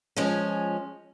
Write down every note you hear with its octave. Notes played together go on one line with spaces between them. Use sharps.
F3 G#3 C#4